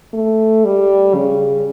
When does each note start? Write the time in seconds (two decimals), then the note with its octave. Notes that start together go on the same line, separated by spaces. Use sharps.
0.14 A3
0.65 G3
1.15 C#3